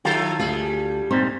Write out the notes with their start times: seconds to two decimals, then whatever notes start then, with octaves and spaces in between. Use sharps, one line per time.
0.05 D#3 F3 E4 F4 A4
0.39 D2 G3 F4 G#4
1.11 A#2 G3 C4 D#4 C5